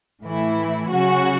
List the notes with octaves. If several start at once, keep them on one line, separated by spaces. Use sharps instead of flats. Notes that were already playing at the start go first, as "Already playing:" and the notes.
A2 E3 A3 E4
C#3 F#3 C#4 F#4